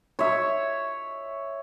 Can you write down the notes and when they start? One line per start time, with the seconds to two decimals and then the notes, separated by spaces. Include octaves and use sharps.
0.19 C#5 E5